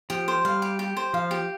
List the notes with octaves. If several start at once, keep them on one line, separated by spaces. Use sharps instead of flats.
F3 G4
C5
G3 F5
G4
G4
C5
F3 F5
G4